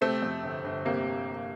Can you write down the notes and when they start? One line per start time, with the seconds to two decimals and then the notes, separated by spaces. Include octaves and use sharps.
0.01 C3 A3 C4
0.22 F2
0.43 G1
0.64 G1
0.85 C3 G3 A#3